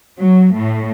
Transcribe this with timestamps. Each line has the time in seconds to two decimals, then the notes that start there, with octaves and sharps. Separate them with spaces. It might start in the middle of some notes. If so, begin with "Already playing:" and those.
0.19 F#3
0.54 A2